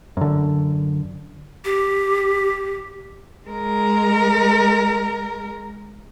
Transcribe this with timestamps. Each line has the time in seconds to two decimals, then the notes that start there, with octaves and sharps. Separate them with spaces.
0.17 F#2 D3
1.65 G4
3.49 G#3 A#4